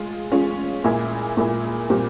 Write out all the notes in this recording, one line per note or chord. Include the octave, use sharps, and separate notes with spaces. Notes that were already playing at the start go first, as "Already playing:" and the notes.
Already playing: G#3 F4
G#3 C#4 F4
A#2 G#3 E4 G#4
A#2 G#3 E4 G#4
A#2 G3 C4 G4